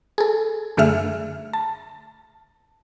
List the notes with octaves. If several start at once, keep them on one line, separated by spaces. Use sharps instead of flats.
G#4 A4
F#2 D3 A3 G#4 E5 F6
A5